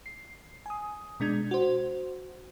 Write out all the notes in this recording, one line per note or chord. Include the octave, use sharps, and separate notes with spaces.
C7
G#5 D#6
B2 G#3 D4 G#6
F#4 C5